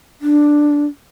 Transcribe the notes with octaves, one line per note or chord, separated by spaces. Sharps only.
D4